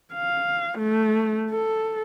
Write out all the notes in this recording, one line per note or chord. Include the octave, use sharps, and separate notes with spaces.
F5
A3
A4